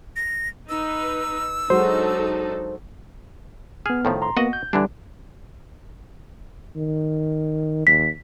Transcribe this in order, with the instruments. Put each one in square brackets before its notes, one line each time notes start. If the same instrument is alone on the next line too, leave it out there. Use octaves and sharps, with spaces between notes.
[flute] A#6
[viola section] D#4 B4 [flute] E6
[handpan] F#3 G#3 F#4 [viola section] D4 D#4 A4 [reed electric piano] C5
[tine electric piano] B3 F6 [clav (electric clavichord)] G#4
[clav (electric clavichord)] A2 D#3 F3
[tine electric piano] A#5 C6
[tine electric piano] A#3 B3 [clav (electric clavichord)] F#4 D#5 F#5
[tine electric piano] G6
[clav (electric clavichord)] D3 E3 D4 [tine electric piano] G3
[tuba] D#3
[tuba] D#2 [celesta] B6